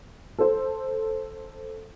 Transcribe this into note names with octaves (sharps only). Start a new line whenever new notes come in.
A4 C5